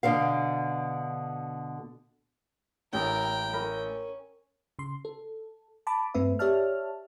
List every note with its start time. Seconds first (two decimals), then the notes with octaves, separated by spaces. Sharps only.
0.03 B2 D3 A4 F5
2.93 A1 A2 A#4 G5
3.53 C#4 A#4 B5
4.79 C#3 C6
5.05 A4
5.87 A5 B5 D6
6.14 G2 A3 C4 B4 E5
6.39 G4 C#5 D5 E5 A5 F6